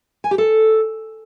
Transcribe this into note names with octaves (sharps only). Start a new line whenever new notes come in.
G#5
G4
A4